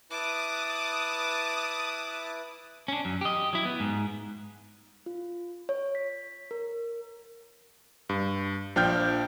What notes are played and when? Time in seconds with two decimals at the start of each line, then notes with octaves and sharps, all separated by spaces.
0.11 E4 B4 A5 D6 D#6 F#6
2.88 C#4 D4
3.05 F#2
3.21 G4 D#5
3.53 F#3 E4
3.65 B3
3.80 G#2
5.06 F4
5.69 C#5
5.95 B6
6.51 A#4
8.09 G2
8.76 A#1 F3 D4 G5 F6 G6